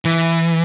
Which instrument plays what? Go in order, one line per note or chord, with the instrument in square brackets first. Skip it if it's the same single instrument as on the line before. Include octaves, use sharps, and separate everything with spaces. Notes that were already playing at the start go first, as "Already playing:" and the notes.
[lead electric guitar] E3